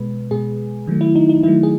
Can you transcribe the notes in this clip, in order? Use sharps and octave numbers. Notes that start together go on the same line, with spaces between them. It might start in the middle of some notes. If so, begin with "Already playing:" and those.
Already playing: B2 G#3 B4
B2 G#3 G#4
D#3 F#3 A3
E4
D#4
D#4
D#3 F#3 A3 E4
G#4